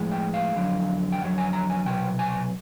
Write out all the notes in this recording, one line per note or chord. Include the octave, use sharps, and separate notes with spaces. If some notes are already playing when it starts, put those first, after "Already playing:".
Already playing: A2 F3 G#3
G5
F5
F2 D3 F#3
G5
F2 D3 F#3 F#5
G#5
A#5
G#5
C2 B2 F#3 G5
G#5